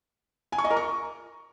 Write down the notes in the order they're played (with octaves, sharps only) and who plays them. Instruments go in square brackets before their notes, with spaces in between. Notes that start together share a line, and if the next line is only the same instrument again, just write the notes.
[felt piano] G#5
C#6
D#5
A#4
C#6